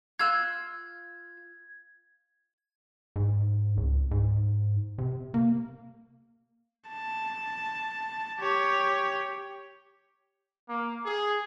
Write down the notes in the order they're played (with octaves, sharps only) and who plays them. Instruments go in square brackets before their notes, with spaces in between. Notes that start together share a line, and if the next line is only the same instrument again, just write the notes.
[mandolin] F4 E6 F#6 [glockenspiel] G#6
[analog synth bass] G#2
C#2
G#2
C3
A#3
[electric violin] A5
G4 C#5
[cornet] A#3
G#4